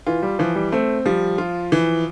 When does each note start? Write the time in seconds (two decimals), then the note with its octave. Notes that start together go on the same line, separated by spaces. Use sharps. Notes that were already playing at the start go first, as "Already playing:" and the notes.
0.07 E3 F4
0.22 G3
0.39 E3 F3
0.55 G3
0.72 A3 C4
1.05 F3 G3
1.38 F4
1.72 E3